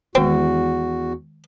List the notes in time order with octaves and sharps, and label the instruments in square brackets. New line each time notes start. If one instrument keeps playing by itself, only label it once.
[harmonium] E2 F#4 [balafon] D#3 G#3 [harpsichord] C4